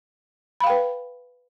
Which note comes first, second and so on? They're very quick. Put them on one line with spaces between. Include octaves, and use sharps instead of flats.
B5 F5 G5 B4